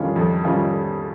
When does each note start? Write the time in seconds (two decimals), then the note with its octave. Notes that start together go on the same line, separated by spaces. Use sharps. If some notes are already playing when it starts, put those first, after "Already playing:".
Already playing: F2 D#3 G3 C#4 F4
0.16 F2
0.44 D#3 G3 C#4 F4